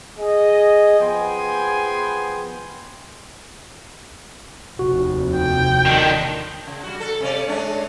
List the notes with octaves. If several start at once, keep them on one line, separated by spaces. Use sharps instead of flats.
G#4 D#5
F3 B3 G#4 G5 G#5 C6
F1 D#2 C3 F#4
G5
D#3 D4
C#3
G3 F#4
A4
C3 C#4 D5
G#3 C#4 D4